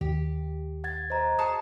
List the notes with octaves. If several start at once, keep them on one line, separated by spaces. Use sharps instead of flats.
D#2 G4
F#5 G#6 A6
C5 D#5 A#5
F#4 G#4 A5 D#6